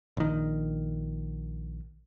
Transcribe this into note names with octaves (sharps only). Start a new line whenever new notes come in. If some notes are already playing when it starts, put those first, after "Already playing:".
A#1 D#3